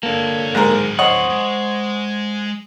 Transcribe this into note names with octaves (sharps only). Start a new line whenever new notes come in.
D3 A#3 C#5 A5
G#2 F#3 C4 A#4
C5 C#5 D#5 F#5
G#3